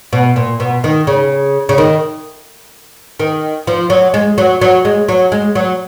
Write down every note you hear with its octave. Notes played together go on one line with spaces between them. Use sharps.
B2
A#2
B2
D#3
C#3
C#3
D#3
D#3
F3
F#3
G#3
F#3
F#3
G#3
F#3
G#3
F#3